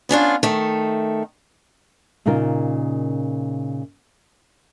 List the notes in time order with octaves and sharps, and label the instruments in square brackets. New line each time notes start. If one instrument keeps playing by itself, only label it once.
[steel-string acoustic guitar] B3 C#4 D4 F4
D#3 A3
[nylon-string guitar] A#2 C#3 D#4 F4 A#4